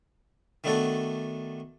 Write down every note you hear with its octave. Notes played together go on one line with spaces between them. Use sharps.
D#3 A3 B3 D4 F#4 A4